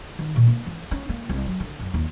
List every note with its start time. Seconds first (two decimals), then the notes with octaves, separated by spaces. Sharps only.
0.19 D#3
0.36 A#2
0.47 A#3
0.66 E3
0.91 C#4
1.09 A#3
1.29 C2
1.47 F#3
1.60 D3
1.80 F#2
1.94 D#2